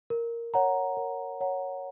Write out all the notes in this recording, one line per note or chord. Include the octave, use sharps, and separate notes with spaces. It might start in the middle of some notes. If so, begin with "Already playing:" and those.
A#4
C#5 F#5 A#5
A#4
C#5 F#5 A#5